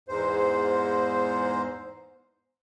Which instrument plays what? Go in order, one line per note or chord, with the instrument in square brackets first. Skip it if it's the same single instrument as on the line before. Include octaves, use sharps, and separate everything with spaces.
[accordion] E2 G#2 C5